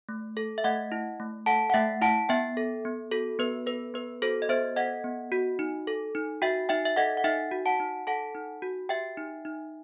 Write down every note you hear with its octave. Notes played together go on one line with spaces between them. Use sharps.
A3
A4
E5
A3 D#5 F#5
E4
A3
A4 F#5 A5
F#5
A3 E5 G5
E4 F#5 A5
B3 E5 G5
A4
B3
F#4 A4
B3 B4
A4 B4
B3 B4
F#4 A4 C5
D#5
B3 C5 E5
A4 D#5 F#5
B3
F#4
D#4
A4
D#4
F#4 E5 G5
D#4 E5 G5
E5
A4 D#5 F#5
F#5
D#4 E5 G5
F#4
F#5 A5
D#4
A4 F#5 A5
D#4
F#4
G4 E5 G5
D#4
D#4